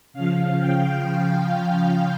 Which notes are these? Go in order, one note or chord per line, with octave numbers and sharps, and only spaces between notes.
C#3 F3 F5
G5
F5